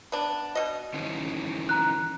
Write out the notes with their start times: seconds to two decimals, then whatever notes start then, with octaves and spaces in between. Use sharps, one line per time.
0.12 B3 D4
0.55 B2 D#5
0.94 D#3 E3 C#4
1.69 A#5 F#6